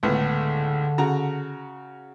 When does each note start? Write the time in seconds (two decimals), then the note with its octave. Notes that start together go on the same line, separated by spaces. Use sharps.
0.03 C#2 A2 D3 B3
0.98 C#3 F#4 A#5